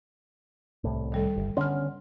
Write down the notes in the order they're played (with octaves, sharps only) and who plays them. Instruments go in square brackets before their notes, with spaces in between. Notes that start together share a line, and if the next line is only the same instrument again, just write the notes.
[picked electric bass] C2 A2
[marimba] D#3 G3 A4
[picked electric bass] G1
[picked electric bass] D3 B3 C#4 [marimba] C6 F6